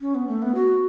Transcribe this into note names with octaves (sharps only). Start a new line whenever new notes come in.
C#4
B3
A3
B3
F#4